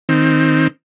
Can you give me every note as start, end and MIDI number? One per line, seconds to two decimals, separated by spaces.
0.09 0.67 51
0.09 0.67 60